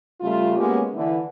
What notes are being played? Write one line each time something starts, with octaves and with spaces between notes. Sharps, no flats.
C#3 G3 A3 F4
G#3 A#3 B3 C#4 F#4 G4
D3 E3